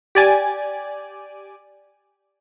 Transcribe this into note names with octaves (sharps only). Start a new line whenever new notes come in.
G4 D5 G#5